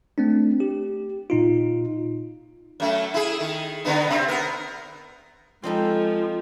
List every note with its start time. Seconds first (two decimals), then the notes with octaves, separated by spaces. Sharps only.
0.18 A3 C4 D4
0.60 G4
1.30 A#2 D#4 F4
2.80 F#2 A3
3.14 E4 G#4
3.40 D#3
3.85 D3 B3 D#4
4.07 C3 C4
4.28 B3 A#4
5.63 F3 G#3 C4 D#4 A4